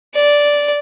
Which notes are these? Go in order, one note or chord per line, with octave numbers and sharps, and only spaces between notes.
D5